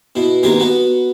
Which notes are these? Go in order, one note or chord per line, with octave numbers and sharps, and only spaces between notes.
B2 E4
D#2 C3 B3 A#4 G#5 C6
B3 F#4